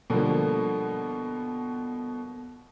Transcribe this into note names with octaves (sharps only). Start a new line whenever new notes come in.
B2 D3 F3 G3 A#3